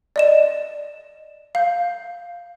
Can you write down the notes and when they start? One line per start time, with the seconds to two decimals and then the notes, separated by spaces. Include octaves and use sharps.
0.16 D5 D#5 E7
1.55 F5 G6